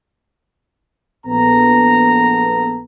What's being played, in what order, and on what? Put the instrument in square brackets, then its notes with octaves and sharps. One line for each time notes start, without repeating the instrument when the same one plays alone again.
[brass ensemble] A#1 B3 A4 A#5